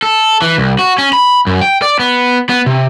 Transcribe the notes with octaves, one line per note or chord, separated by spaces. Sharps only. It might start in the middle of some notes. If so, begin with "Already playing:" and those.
A4
E3
C2
F#4
C#4
B5
F#2
G5
D5
B3
B3
C3